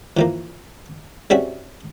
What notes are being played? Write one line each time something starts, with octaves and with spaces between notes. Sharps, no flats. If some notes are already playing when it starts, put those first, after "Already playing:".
E3 F3 A#3
G3 C4 C#4 F#4 G#4 E5